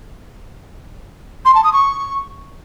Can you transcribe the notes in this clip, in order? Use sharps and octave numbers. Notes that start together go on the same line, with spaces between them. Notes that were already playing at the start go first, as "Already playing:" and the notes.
C6
A5
D#6
C#6